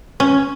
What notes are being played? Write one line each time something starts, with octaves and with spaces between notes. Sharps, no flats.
C#4